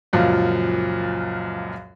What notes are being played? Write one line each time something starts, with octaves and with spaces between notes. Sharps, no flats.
C#2 F#2 A#2 F3